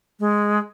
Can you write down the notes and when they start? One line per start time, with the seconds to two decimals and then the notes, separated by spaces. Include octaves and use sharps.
0.20 G#3